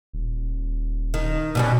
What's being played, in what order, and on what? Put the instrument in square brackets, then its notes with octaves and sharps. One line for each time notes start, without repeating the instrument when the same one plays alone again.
[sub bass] D#1
[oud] D#3
B2 G3 C#4